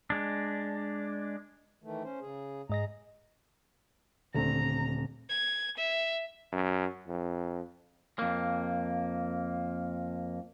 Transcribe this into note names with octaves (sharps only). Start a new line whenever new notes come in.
G#3 D4
D#3 E3 A3
C#4 C5
C#3 G#4
G#2 G#4 D#5 A#5 A#6
D#1 D3 A3 C4 A#5
G#6
E5
F#2
F2
F2 A#3